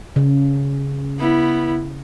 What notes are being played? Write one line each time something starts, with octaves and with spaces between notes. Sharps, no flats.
C#3
B3 E4